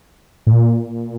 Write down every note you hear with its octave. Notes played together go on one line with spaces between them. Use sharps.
A2
A#2